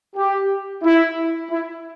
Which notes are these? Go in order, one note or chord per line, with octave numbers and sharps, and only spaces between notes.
G4
E4
E4